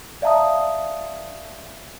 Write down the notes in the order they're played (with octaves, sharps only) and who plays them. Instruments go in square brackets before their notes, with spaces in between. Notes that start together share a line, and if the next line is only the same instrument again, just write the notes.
[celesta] D5 E5 F5 A5 A#5 D#6